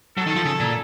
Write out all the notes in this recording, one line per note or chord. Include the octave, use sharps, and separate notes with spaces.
F#3 A4
D#3
F3
C#3
A#2